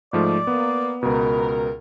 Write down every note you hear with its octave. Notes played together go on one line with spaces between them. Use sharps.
G#2 F3 A3 D5
A#3 B3 B4
C#2 B2 A#4 B4